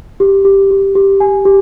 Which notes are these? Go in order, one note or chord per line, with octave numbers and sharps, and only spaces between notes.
G4
G4
G4
G4
G#5
G4